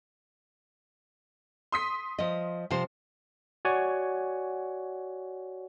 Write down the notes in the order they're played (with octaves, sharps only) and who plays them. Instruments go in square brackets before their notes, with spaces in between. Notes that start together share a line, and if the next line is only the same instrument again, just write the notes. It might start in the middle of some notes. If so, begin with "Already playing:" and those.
[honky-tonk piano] C6 D#6 B6
[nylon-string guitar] F3 D#5
C3 F3 C5
[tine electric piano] F#4 C#5 D5 F#5 G#5